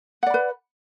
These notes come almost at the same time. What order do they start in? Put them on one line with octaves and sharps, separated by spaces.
F#5 D5 B5 B4